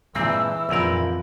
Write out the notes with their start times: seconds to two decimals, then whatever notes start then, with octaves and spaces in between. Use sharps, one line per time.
0.15 G2 A#2 E3 G#3 C4 E6
0.69 A#1 F2 G#2 F3 A#4 B4